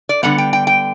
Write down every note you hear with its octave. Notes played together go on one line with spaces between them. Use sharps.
D5
D3 G3 B3 F#5
G5
G5
G5